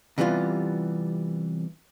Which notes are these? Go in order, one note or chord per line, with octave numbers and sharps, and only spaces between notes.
C3 E3 G3 B3 F4